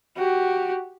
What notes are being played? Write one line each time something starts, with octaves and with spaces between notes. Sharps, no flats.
F#4 G4